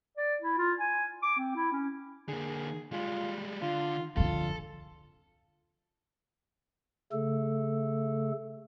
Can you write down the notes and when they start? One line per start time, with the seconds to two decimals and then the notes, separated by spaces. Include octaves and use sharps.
0.17 D5
0.42 E4
0.58 F4
0.80 G#5
1.23 D6
1.38 C4
1.55 E4
1.72 C#4
2.29 D3 A#3 G#4
2.92 G3 G#3 F4
3.62 D3 F4
4.17 F2 D3 F4 A4
7.12 C#3 A3 A4